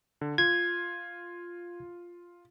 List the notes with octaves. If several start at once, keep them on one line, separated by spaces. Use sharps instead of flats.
D3
F4 G#6